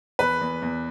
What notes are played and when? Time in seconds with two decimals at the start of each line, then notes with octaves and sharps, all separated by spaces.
0.19 E2 B4
0.41 E2
0.62 E2